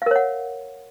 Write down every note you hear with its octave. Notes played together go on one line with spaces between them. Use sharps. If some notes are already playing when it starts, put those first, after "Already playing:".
A#4 C#5 F5 F#5